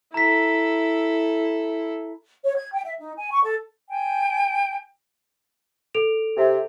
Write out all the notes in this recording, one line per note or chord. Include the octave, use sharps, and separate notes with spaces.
E4 A4 A#5 B6
C#5
G#6
G5
E5
D#4
G#5
C#6
A4
G5 G#5
A4 D7 F7
C3